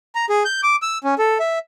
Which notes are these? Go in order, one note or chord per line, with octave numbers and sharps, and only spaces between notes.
A#5
G#4
G6
D6
E6
C#4
A4
E5